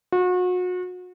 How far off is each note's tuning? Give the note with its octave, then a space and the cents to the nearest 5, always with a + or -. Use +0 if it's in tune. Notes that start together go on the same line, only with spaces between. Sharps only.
F#4 -35